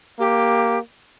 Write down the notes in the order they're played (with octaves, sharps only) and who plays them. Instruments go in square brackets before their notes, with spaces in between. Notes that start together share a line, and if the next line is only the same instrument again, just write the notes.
[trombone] A#3 [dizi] G4